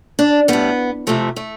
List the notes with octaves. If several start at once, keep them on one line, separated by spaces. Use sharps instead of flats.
D4
A2 G3 B3
F2 C3 F3 A3
A3